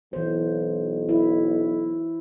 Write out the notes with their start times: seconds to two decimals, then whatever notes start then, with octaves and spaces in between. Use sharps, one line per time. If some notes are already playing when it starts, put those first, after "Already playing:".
0.13 B1 E3 C5
1.09 E4